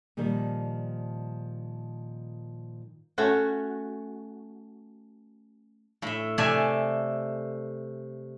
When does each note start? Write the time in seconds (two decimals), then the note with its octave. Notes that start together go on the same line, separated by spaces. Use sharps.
0.17 A#2 D#3 F3 G3
3.18 A3 C#4 F#4
6.02 A2 E5
6.38 C3 A3 D5 E5 G#5